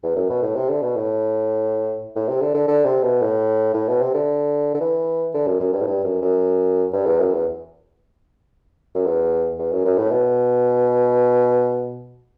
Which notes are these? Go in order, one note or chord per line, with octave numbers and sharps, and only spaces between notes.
E2
F#2
B2
A2
C3
D3
B2
A2
A2
C3
D3
D3
D3
C3
B2
A2
A2
B2
C3
D3
D3
E3
D3
F#2
F#2
G2
A2
G2
F#2
F#2
G2
E2
F#2
E2
F#2
E2
E2
F#2
F#2
A2
B2